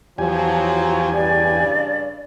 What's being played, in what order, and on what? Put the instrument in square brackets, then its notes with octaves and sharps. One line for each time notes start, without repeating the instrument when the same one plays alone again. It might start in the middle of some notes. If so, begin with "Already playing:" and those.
[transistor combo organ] E2 G4 G#5 [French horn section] F3 F#3
[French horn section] G2 C#3 [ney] D5